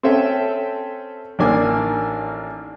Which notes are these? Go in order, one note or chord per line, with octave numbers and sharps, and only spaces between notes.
C4 C#4 A4 E5 G5
A1 D#3 A#3 D4 G#5 D6